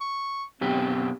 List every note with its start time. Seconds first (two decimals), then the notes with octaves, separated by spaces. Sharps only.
0.01 C#6
0.61 F#2 B2 C4 G4